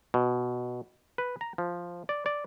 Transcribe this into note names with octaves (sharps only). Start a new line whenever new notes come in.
B2
B4
A#5
F3
D5
D5